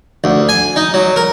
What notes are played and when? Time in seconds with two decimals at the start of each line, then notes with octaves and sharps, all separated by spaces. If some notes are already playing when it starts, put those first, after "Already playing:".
0.24 D2
0.49 G#5
0.76 D#4
0.94 F#3
1.16 A#4